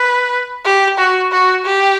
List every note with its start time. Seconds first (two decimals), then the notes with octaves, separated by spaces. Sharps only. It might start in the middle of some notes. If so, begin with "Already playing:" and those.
Already playing: B4
0.65 G4
0.98 F#4
1.31 F#4
1.65 G4